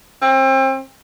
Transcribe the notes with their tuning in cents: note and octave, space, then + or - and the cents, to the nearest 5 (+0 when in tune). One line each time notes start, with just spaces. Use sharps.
C4 +30